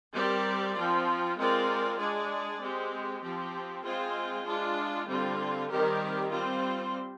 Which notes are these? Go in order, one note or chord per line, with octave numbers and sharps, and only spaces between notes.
G3 C4 G4 A#4 D5
F3 C4 F4
G#3 C4 F4 A#4 D5
G#3 D4 G#4 D5
G#3 C4 G4
F3 C4 G4
G#3 C4 F4 G#4 C5
G#3 D4 F4
D3 G3 C4 F4
D#3 G3 C4 G4 A#4
G3 C4 F4 C5